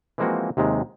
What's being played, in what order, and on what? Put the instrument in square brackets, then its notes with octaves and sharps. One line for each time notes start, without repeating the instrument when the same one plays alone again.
[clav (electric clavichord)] E3 F3 G#3 A#3 C4 F#4
D#2 C3 D#3 G#3